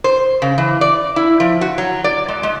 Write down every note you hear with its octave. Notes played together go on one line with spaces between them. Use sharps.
C5
C#3
E3
D5
E4
F3
F#4
F#3
D5
G#3
G#3